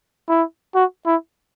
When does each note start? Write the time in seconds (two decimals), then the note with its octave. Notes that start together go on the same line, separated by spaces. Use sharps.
0.28 E4
0.75 F#4
1.06 E4